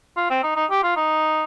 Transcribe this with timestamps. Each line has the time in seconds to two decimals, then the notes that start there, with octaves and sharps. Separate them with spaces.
0.17 F4
0.30 C4
0.43 D#4
0.56 D#4
0.70 G4
0.83 F4
0.97 D#4